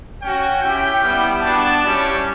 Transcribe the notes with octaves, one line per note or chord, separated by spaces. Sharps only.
C#4 F#4 G5
C#4 E4 G4 G5
G3 B3 E4 G4
B3 D4 F#4 A5
G3 C#4 E4 G4